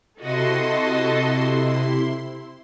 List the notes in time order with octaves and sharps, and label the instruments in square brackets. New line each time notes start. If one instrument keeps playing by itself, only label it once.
[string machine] C3 E4 C6 [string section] F#4 A4 D#5